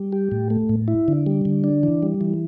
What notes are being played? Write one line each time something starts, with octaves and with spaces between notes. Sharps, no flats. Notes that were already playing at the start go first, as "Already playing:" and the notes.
Already playing: G3
G4
A2
A3
A2
E4
D3
G3
D3
D4
E3
G3
E3